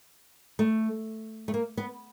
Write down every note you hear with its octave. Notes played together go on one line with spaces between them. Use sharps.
A3
A3
A#3
B3